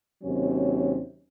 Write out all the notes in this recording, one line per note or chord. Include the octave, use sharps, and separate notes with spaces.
D#2 C3 F#3 C#4